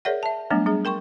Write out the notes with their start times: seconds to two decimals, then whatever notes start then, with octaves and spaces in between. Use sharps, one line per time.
0.05 G#4 A#4 C#5 D5 E5 F#5
0.23 E5 A5
0.50 F#3 G3 A3 B3 D4
0.66 G3 D4 G#4
0.85 A#4 G5 C6 C#6